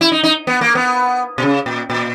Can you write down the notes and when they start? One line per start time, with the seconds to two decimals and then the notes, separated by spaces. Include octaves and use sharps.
0.01 E4
0.12 D#4
0.24 D#4
0.47 B3
0.61 A#3
0.75 B3
1.38 B2
1.42 C#3
1.66 A#2
1.90 A#2